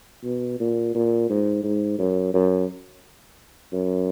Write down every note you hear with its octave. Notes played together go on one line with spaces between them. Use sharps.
B2
A#2
A#2
G#2
G#2
F#2
F#2
F#2